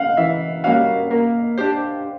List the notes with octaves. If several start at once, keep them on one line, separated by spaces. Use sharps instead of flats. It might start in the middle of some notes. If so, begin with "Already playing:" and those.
Already playing: F5 F#5
E3 E5
G3 A#3 C#4 F#4 F5
A#3
D4 G4 C5